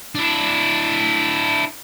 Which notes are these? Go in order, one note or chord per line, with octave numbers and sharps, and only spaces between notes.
D4 E4